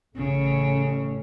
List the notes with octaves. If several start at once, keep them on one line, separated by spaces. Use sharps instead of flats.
A1 A2 C#3 C#4